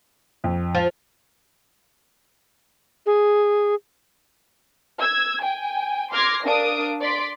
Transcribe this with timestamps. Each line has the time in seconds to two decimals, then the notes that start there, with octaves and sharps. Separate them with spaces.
0.44 F2
0.75 F3
3.06 G#4
5.00 E6 G#6
5.41 G5 G#5
6.11 C6 D6 F6 G#6 A#6 C7
6.45 D4 A#4 F5 D#6 D7
7.01 D5 C6 B6 D7